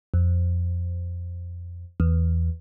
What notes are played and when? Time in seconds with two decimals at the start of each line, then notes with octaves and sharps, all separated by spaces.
0.14 F2
2.00 E2